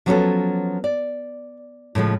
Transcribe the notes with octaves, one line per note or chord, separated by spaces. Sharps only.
F3 F#3 B3 C#4 G#4 A4
D5
A2 C#3 F3 G#3